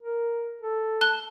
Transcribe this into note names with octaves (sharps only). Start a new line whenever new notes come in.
A#4
A4
A5 F#6 G7